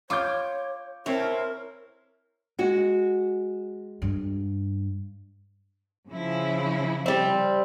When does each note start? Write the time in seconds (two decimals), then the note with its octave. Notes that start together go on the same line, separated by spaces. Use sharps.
0.10 F4 C#5 C#6 D6 G6
1.06 C4 E4 A#4 C#5
2.58 G#3 F#4
4.02 G2
6.08 C#3 F3 E4
7.06 G3 C4